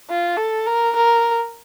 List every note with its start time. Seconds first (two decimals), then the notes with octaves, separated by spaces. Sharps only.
0.10 F4
0.38 A4
0.67 A#4
0.96 A#4